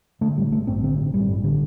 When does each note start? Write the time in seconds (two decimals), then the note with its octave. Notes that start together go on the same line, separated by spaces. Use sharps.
0.21 D3 A3
0.37 A1 G3
0.52 A1 A3
0.67 G2 C4
0.83 D3 C4
0.98 A1
1.14 A1 G3
1.29 G2
1.44 D3